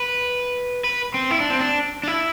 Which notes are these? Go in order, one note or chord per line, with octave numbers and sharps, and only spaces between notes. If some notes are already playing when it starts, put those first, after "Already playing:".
Already playing: B4
B4
C4
E4
D4
C4
D4
D4
E4